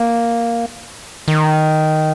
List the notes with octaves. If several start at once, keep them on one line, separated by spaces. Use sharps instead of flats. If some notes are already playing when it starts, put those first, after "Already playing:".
Already playing: A#3
D#3